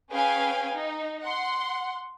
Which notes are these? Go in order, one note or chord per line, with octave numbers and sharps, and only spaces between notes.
C#4 G#4 B4 F5 G5 G#5
D#4
F#5 C6